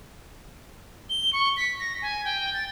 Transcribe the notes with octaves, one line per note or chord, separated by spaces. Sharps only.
G7
C#6
B6
A#6
G#5
G5
A6